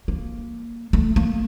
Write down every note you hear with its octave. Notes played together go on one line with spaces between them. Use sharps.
A#3
A3
A#3